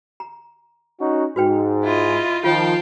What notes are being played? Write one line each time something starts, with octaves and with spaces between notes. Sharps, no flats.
A#5
C#4 D#4 F#4
G#2 F#4 B4 G5
E4 F4 D#5
D#3 F3 F4 F5 G5 A5